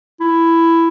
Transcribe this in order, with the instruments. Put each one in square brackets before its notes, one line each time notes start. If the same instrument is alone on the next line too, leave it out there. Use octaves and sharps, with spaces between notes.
[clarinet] E4